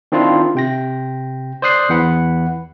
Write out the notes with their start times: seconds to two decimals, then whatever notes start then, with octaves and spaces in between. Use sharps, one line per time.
0.12 D#3 C4 D4 E4 F4
0.55 C3 G5 A#6
1.62 C5 D5 D#6 F#6 C7
1.89 E2 E3 F#5 B5